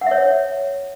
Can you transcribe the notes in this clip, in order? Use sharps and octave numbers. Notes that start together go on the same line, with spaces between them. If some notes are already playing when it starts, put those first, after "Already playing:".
C#5 E5 F#5